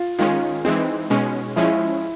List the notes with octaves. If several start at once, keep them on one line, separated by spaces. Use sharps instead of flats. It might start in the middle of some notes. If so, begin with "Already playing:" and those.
Already playing: F4
D#3 G#3 C#4 F4
E3 G#3 C4 D#4
B2 G#3 C#4
F3 G#3 C#4 E4